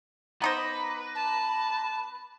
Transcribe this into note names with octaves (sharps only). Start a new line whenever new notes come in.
B3 D#4 B4 C5 A#5 D6 A#6
A5